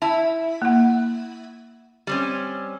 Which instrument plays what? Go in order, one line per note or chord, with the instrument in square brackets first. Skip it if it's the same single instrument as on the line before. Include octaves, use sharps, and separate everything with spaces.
[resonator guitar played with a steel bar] E4 [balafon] A5
[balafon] A#3 F#5
[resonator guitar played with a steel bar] G3 C4 C#4